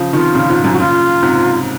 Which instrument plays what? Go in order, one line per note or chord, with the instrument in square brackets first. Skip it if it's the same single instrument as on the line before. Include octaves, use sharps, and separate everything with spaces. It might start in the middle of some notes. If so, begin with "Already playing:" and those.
Already playing: [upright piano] C#3 F3
[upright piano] C3 D#3 [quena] F4
[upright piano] A#2 C#3
G#2
F#2 A#2
[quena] F#4
[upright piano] A#2 C#3 [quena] F4
[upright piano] G#2 C3